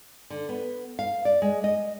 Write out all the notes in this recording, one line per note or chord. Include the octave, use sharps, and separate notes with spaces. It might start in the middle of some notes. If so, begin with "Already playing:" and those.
D3
B3
F5
D5
G#3
D#5